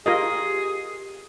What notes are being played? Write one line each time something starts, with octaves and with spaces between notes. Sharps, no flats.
F4 G4 G#4 A#4 D#5